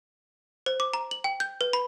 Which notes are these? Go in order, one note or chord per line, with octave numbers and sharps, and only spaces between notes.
C5
D6
A#5
F#7
G5
G6
B4
B5